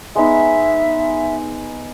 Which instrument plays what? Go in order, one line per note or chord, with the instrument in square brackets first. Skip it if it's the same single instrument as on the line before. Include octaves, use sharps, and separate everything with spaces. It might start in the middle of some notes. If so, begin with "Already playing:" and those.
[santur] G#3 B3 D#4 [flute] E5